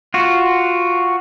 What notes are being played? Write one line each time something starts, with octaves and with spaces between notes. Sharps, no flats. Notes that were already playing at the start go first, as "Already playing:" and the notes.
F4 F#4